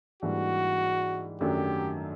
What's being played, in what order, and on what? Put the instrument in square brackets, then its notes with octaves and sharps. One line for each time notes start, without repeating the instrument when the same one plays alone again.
[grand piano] G#2 E3 G3 A#3 D4 [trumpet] F#4
[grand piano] F#2 D#3 F#3 A3 D4 [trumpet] G4